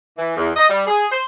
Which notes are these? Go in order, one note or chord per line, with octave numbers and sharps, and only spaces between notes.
E3
E2
D#5
G3
G#4
C5